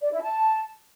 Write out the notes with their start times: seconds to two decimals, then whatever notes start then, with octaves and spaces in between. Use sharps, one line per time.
0.01 D5
0.12 E4
0.22 A5